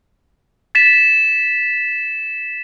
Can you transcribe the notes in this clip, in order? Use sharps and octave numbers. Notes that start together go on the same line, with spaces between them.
A6 B6 E7